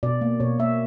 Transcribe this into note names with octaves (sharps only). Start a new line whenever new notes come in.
B2 D5
A#3
B2 C#5
A#3 E5